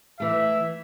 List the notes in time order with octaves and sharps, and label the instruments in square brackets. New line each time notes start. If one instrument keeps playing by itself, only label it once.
[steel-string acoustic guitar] E3 A3 [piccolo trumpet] E5